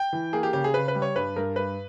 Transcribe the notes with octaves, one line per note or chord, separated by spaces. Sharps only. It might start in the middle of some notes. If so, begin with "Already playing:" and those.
Already playing: G5
E3
A#3 G#4
G4
C#3 G4
G#4
C#3 B4
B4
G3
C#5
G2 B4
G2 A#4
G2 B4